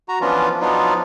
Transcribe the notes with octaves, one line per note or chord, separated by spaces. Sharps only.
F#4 A#5
E3 F3 B3 C#4 D4 F4
F3 F#3 B3 D4 D#4 F4